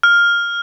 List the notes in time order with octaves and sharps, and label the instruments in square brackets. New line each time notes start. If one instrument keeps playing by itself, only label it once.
[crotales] F6